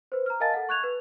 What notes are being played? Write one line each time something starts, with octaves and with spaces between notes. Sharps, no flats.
B4 C5
A#5 F6
A#4 D#5 F5 G#5 A5 A6
A4 F#5
C#6 F#6 G#6 F7
B4